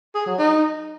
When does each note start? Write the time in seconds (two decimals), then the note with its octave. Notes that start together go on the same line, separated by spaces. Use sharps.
0.15 G#4
0.27 F#3
0.39 D#4